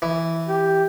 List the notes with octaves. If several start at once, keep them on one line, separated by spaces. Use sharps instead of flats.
E3
G4